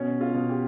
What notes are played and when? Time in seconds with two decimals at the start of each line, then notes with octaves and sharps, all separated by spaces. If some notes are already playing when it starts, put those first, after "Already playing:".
Already playing: B2 C#4
0.21 F4
0.34 B2
0.49 G4